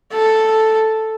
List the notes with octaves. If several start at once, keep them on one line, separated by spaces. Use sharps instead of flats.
A4